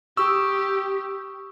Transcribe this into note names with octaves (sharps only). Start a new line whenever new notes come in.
G4 C#6 D#6 E6